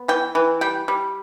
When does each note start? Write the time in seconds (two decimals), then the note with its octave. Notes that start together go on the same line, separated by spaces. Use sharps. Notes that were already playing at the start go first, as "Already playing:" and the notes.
Already playing: B3
0.08 E3 G5
0.35 E3
0.61 G3 G5
0.88 G3